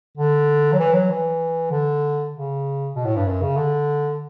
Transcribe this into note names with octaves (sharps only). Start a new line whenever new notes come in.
D3
F#3
E3
F#3
E3
D3
C#3
B2
A2
G2
F#2
C#3
D3